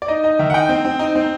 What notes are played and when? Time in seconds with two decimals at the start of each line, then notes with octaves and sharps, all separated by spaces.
0.02 D5
0.08 D#4 D#5
0.24 D#4 D#5
0.39 D#3 E5
0.50 F#5
0.54 D#4 G5
0.69 C4
0.85 C4
0.99 D#4
1.15 C4